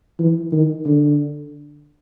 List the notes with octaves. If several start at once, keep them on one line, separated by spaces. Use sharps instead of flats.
E3
D#3
D3